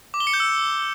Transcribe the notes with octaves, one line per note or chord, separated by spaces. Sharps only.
D6
G7
C#7
G6
E6